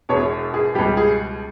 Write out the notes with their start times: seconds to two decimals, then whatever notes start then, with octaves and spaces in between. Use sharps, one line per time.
0.09 E1 E2 B2 C#5
0.54 G#4
0.75 C#2 B2 G3 G4
0.97 G#4